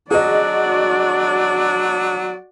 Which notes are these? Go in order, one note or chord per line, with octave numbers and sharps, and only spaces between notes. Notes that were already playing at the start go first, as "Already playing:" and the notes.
F#3 D4 F#4 G#4 D5 D#5